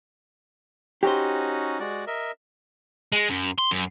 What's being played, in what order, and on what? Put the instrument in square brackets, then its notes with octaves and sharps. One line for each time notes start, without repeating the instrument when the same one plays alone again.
[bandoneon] C#4 D#4 F#4 [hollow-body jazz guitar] G4 C5
[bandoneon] G#3 F#4 D5
A#4 D#5 E5
[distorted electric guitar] G#3
F#2
C6
F#2